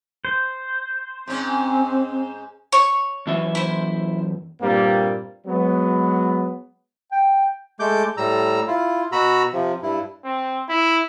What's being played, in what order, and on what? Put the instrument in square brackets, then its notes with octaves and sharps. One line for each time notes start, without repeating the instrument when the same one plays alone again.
[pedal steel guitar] C5
[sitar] G#2 C#4 [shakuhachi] C4
[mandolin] C#5 C#6
[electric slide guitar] F#2 E3 E5
[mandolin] E4 C5
[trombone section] G2 A#2 G3 A#3 C4
F#3 G#3 B3
[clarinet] G5
[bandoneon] G#3 A3 D6 G6
A2 G3 A#5 E6
E4 F4
B2 F#4 A#5 B5 E6
C3 F3
G2 E4
[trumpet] C4
E4